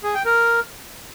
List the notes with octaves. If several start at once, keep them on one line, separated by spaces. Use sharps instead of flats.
G#4
G5
A#4